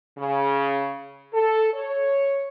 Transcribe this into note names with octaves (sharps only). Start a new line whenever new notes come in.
C#3
A4
C#5